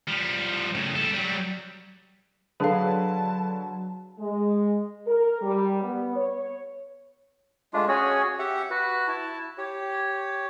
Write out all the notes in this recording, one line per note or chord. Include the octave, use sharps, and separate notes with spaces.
F3 G3
A2 C#3
G3 A4
F#3 G3
D3 F#3 G#4 B4 F5 A5
G#3
A#4
G3
B3
C#5
G#3 A3 D4 F4
C#4 F#4 G#4 C#5
G4 E5 F#5
F#4 B4
E4 A5
G4 C#5